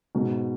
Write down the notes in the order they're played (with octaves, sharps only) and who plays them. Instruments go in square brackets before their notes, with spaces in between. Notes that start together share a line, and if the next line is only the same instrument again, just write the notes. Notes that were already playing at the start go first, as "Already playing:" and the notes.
[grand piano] G#2 B2